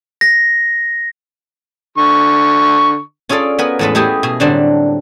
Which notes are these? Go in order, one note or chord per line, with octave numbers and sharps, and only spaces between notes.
A#6
D3 C#6
C#4 F4 G#4 A4 D5
B3 A#4 B4 G#5 B5
E2 A2 G#3 A4 B4 B5
A3 E4 G4 G#4 D#5
B2 G#4
A2 D3 F#3 G3 C4 D4